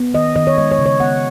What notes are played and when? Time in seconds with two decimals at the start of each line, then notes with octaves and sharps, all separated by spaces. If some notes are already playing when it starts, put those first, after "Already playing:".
Already playing: B3
0.14 D#3 D#5
0.36 D#3 D#5
0.47 C#5
0.58 G#3 D#5
0.71 C#5
0.79 C#3
0.86 C#5
1.00 B3 F#5